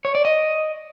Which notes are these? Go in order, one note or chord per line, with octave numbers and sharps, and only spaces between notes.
C#5
D5
D#5